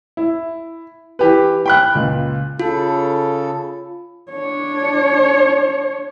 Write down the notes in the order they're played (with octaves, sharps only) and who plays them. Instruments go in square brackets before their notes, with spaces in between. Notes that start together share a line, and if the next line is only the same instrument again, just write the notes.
[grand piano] E4
E3 G4 B4
G5 B5 F#6
C#2 A#2
[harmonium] C#3 A4 [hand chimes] F4
[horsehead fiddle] D4 C#5